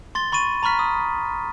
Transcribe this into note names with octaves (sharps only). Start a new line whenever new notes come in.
C6 A6 G7
B5 C#6 A6 D#7
A#5 B5 C#6 F6 B6
D#6